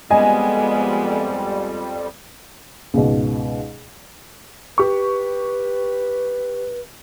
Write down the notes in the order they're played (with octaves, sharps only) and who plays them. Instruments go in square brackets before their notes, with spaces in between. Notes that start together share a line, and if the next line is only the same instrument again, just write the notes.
[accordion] F2 G3 [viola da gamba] G#3 B3 [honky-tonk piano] D#5 G#5
[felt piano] C#2 G#2 B2
[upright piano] G4 C#6 [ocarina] B4